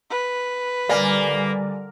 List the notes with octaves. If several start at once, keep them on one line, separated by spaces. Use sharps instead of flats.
B4
D3 G3 A#3 D5 G#5 F6